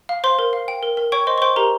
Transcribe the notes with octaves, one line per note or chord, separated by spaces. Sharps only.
F5
C5 F5 C6
A#4
F5
G5
A#4
A#4
C#5 G5 C#6
C5 D#5 C6
C#6
C5 G5 C6
G4 A#4 A#5